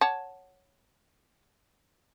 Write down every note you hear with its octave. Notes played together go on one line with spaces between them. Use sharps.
C#5 F#5 A5